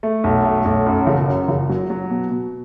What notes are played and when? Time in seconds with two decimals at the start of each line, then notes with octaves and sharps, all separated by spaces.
0.03 A3
0.24 B1
0.44 A3
0.65 B1
0.86 F#2
1.07 F#1
1.28 F#2
1.48 F#1
1.69 F#3
1.90 F#3
2.11 B2
2.31 B2